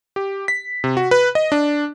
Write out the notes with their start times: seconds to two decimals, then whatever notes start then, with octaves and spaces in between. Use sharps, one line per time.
0.16 G4
0.48 B6
0.84 C3
0.97 F#4
1.11 B4
1.35 D#5
1.52 D4